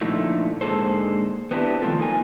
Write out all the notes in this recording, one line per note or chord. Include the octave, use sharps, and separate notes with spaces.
A#2 D3 F3 A3 D#4 E4
G#2 D3 A#3 G#4 A4 C5
B3 C4 D4 E4 G4
D#3 F3 A3 C4 F4 A4
A#3 D#4 F4 G#5